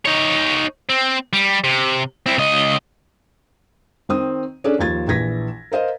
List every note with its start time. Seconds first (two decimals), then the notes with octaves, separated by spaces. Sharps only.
0.05 D#4 C#5
0.89 C4
1.33 G3
1.64 C3
2.26 C4 E4
2.38 C#2 D#5
4.09 D#3 C4 D#6
4.64 C#4 D4 G#4 A4 D5
4.79 D#2 F3 G#6 A6
5.08 A#1 E3 G#6 A#6 B6
5.72 A#4 C5 D#5 F5